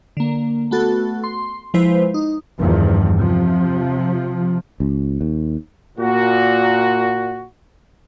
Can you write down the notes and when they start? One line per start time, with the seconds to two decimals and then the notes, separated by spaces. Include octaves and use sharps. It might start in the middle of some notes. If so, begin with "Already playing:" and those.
0.17 D3 A#3
0.71 A3 B3 F#4 A4
1.24 C6
1.74 F3 G#3 E4 B4 C5
2.14 D#4
2.60 E2 G2 D#3 F3
3.18 C3 F3
4.80 C#2
5.21 D#2
5.98 A#2 F#4